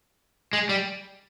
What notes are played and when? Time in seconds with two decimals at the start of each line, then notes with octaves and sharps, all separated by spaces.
0.53 G#3
0.69 G3